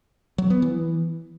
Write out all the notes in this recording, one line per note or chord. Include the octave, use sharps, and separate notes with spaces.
F#3
B3
E3